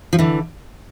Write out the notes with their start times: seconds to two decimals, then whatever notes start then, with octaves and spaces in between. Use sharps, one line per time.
0.13 F3
0.19 D3 E3